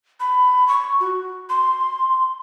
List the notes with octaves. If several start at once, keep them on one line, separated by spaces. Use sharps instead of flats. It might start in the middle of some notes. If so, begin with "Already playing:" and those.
B5
C#6
F#4
C6